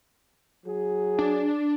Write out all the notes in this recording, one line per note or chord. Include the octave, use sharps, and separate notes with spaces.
F#3 G#4
D4